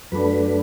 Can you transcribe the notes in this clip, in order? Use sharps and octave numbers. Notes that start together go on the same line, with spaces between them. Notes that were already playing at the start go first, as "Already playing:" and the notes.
F#2 F#3 A3 D4 B4